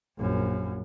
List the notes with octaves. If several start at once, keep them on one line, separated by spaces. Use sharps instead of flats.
A#1 F#2